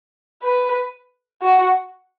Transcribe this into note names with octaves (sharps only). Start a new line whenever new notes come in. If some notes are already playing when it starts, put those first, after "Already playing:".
B4
F#4